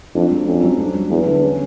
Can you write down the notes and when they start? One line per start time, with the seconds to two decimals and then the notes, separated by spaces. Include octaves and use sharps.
0.15 F2 D4
0.31 F#3
0.47 F2 C#4
0.64 F#3
0.78 D4
0.94 G3
1.10 E2 B3
1.26 D3
1.42 C#4